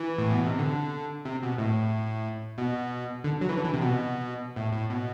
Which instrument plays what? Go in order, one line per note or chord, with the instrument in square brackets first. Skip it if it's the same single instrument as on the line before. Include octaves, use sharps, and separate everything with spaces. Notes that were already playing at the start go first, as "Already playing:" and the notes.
Already playing: [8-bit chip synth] E3
A2
B2
C3
D3
C3
B2
A2
B2
D3
F#3
E3
D3
E3
C3
B2
A2
A2
B2